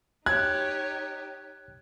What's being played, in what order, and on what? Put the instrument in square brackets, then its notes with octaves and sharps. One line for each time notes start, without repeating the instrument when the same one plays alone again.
[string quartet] D#4 G4 C#5 [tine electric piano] F#6 [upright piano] G#6